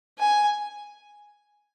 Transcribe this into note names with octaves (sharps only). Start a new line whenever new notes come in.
G#5